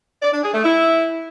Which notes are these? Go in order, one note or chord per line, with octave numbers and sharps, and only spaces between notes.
D5
D4
G#4
A3
E4